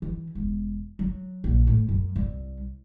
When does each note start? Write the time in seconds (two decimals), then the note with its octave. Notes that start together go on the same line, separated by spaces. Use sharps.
0.02 E3
0.35 E1
0.99 F#3
1.44 A#1
1.67 A2
1.89 F#2
2.16 C2